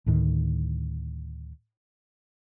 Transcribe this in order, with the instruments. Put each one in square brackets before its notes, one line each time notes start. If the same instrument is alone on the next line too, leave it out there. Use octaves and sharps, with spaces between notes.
[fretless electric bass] D2 A2 D#3